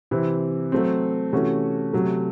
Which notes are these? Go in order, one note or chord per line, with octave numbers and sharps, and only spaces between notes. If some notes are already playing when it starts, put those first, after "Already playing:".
C3 E3 C4 E4
F#3 A3 C4
C3 E3 A3 C#4 F#4
C3 F#3 A3